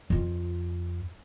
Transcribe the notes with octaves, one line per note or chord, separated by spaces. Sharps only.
F2 F4